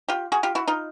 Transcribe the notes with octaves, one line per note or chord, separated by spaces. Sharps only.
F4 G4
F#4 G#4
F4 G4
E4 F#4
D#4 F4